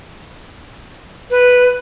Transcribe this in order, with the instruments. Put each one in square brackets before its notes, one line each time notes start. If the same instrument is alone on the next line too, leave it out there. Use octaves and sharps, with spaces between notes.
[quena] B4